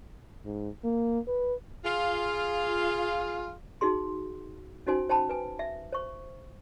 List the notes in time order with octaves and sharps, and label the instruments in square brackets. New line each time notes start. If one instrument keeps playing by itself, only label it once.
[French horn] G#2
A#3
B4
[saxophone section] F4 [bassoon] G#4
[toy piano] D#4 F#4 G#4 C6
C#4 D#4 F#4 C5 G#5
C5 G5 A5 B5
B4 G#5
E5
C5 C#6